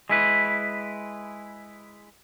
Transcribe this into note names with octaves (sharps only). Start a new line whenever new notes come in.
G#3 E4 B4